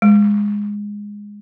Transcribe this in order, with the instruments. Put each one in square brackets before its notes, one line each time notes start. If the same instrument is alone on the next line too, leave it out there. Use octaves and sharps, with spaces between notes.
[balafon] G#3